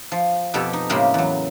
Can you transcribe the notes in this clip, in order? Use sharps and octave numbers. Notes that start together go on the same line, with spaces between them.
F3
F2 B2 G4 A4
D#4
A2 C#3 G#3 A#3 G4
E2 F#3